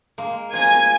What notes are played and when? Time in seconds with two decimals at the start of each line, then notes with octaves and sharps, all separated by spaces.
0.18 G#3 A#3
0.53 F3 G#5 A#5